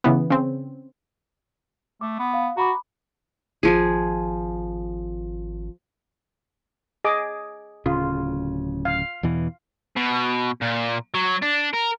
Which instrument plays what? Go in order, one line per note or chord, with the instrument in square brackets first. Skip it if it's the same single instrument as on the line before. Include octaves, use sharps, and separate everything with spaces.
[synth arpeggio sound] C#3 E3 B3
C#3 C4
[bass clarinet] A3 [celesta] D6
[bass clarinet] B3
[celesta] F5
[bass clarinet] F#4 [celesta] A#5 B5 D6
[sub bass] G#1 [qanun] F3 G#4
[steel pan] G#4 D#5 D6
[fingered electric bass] D1 C#3 [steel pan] F4
[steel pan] F5
[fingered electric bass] E2 B2 E3
[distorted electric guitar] B2
A#2
F#3
D4
A#4